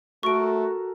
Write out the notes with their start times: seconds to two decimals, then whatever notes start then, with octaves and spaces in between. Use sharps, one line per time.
0.23 A3 F#4 A4 A#4 C#6 D7